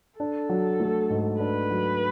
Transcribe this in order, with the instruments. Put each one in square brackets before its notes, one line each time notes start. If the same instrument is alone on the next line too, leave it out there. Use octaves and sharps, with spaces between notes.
[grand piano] D4 [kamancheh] A4
[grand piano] F#3
A3
G#2
[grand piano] D4 [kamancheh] B4
[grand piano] F#3